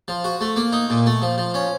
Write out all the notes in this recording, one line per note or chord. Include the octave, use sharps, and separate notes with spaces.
F3
F#4
A3
A#3
D#4
A#2
A3
F3
F3
C#4